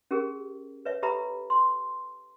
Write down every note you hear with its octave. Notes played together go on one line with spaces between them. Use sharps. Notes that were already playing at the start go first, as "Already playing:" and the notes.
C#4 G4 G#4 A#4
B4 C#5 E5
G4 A4 B4 E5 A#5 B5
C6